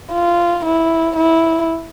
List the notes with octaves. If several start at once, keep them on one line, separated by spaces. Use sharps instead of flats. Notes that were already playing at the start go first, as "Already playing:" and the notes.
F4
E4
E4